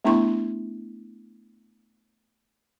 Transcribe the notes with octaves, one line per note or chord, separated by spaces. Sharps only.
A3 B3 D4 E4 C6 C#6